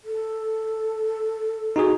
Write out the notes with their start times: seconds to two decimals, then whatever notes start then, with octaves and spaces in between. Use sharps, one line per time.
0.05 A4
1.76 D#4 F#4 G#4